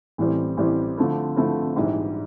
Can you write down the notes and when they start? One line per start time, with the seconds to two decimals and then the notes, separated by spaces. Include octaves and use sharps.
0.18 A1 A2 E3 G3 C4
0.57 A1 A2 E3 G3 C4
0.97 D3 F3 A3 C4 E4
1.36 D3 F3 A3 C4 E4
1.76 A#1 G#2 E3 G3